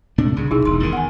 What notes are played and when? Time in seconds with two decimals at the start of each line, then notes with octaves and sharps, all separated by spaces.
0.18 C3 A3 D4
0.36 C2 C#3
0.51 B1 D#4 E4 G#4
0.65 E1 C6
0.80 E2 D#3
0.93 F#5 G#5